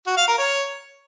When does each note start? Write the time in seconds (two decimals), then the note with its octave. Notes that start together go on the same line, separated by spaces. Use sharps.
0.07 F#4
0.17 F5
0.28 A#4
0.38 C#5